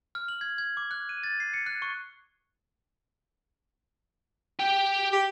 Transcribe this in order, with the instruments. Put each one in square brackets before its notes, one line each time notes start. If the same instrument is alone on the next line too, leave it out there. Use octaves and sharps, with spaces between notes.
[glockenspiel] F6
F#7
G#6
G#6
D6
F#6
D#7
A6
C7
C#7
F#6
C#6
[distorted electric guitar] G4 G5
[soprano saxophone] G4